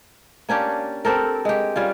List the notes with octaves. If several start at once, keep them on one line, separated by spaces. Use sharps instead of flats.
A#3 C#4 D4 G4
C4 G4 A4 A#4
G#3 G4
G3 C#4 F4